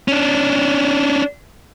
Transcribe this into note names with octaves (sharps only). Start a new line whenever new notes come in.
C#4 D4